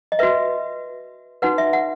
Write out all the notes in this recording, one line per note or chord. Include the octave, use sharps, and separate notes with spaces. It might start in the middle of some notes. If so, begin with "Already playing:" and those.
D#5
F#4 B4 E5
D#4 F#4 B4 F#5
E5
F#5